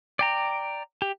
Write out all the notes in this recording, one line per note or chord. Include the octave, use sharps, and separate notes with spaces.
D5 G5 A#5
G4